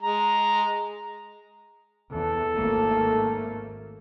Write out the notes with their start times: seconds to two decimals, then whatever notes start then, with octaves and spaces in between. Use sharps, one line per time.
0.02 G#3 A#5
2.13 E2 A4
2.55 G#1 A3 A#3